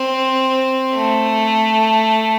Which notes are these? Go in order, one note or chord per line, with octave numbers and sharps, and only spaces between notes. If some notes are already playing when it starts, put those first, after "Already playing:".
Already playing: C4
A3